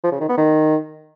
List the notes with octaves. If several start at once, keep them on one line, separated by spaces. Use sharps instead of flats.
F3
C#3
D#3
B3
D#3